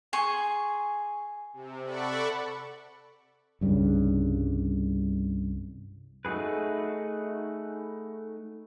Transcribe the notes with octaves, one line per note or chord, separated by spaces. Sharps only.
G#4 G#5 C6 C#6
C3
A4 D5 F#5 B5 C#6
C2 G2 C#3
A3 D#4 F#4 G#4 B4